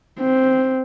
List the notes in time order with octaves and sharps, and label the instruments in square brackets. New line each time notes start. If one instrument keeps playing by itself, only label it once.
[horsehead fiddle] C4